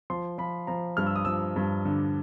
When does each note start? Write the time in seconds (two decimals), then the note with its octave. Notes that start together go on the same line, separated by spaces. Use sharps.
0.10 F3 C6
0.38 F3 B5
0.67 F3 A#5
0.97 G2 F6
1.06 E6
1.16 D#6
1.25 F3 E6
1.56 G2
1.85 D3